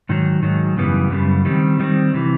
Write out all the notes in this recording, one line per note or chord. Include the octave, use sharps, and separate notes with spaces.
G#2 D#3 F#3
G#2 D#3 F#3
F#2 C#3 E3 G3 B3
F#2 C#3 G3 B3
D#3 G3 C4
D#3 G3 C4
C3 E3